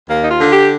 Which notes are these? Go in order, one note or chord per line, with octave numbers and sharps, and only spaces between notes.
D#2 A#3
D#4
F4
D3
G4